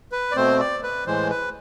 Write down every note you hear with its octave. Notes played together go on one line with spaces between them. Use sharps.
B4
D5
B2 A3 C4 C5
D5
B4
A2 E3 G#3 C5
B4